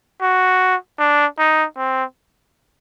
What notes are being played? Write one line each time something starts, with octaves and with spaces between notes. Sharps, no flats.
F#4
D4
D#4
C4